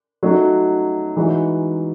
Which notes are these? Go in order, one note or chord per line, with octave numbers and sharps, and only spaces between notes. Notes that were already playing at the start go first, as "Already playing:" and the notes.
F#3 A3 D#4 F#4
E3 G#3 D#4 F#4